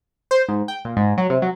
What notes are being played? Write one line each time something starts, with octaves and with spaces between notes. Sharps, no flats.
C5
G#2
G5
A#2
G#2
F#3
C3
F#3